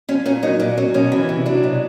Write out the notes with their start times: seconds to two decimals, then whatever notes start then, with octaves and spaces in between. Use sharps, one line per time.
0.09 F3 C#4
0.26 A#2 C#4
0.43 F#3 D#4
0.60 A#2 D4
0.78 F#3 C#4
0.94 B2 C#4
1.12 E3
1.29 C3
1.46 F#3 D4
1.63 B2